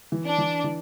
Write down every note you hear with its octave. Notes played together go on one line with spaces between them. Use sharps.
E3
D4
E3
E3